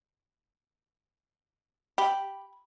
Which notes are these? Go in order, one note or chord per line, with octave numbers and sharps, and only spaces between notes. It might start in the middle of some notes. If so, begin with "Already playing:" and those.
G4 B5